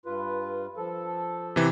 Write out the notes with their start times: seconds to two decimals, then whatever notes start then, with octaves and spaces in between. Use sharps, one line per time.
0.06 G2 F4 B4
0.77 F3 A4
1.56 C3 E3